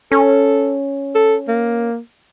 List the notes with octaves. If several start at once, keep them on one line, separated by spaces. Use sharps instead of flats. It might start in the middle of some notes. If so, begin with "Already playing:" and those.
C#4 A4
A4
A#3